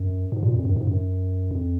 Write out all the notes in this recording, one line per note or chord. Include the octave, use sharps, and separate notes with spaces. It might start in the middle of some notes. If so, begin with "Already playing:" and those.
Already playing: F#2
G#2
A#2
F2
F#2
G#2
F#2
F2